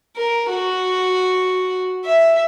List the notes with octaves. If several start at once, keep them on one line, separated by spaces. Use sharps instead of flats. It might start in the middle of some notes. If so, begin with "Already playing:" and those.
A#4
F#4
E5